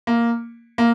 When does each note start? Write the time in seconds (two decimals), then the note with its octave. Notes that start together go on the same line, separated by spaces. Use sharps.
0.07 A#3
0.78 A#3